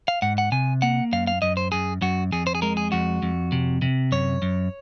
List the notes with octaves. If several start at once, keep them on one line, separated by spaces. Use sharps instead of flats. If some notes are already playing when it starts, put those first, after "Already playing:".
F5
G#2 F#5
F#5
C3 G#5
A#3 F#5
F#2 F5
F5
F#2 D#5
C5
F#2 G#4
F#2 F#4
F2 G#4
C5
G#4
G#3 A#4
G#4
F2 F#4
F2
C3
C3
F#2 C#5
F#2